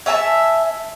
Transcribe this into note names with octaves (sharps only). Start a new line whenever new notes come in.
C#5 E5 G#5 A5